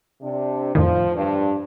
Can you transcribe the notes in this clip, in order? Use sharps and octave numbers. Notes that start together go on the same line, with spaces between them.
C3 D4
F2 A2 D#3 F3
G2